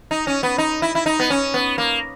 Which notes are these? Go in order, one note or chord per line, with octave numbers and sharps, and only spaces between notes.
D#4
C#4
B3
D#4
E4
E4
D#4
B3
C#4
B3
A#3